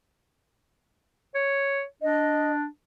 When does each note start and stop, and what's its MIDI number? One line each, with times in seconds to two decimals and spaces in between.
1.35 1.82 73
2.02 2.66 62
2.02 2.52 75